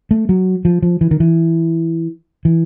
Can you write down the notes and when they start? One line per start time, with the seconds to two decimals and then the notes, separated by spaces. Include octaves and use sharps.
0.11 A3
0.29 F#3
0.65 F3
0.82 F3
1.01 E3
1.11 D#3
1.20 E3
2.45 E3